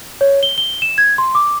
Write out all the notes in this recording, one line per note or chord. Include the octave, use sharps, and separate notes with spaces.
C#5
G7
G7
E7
G#6
C6
D6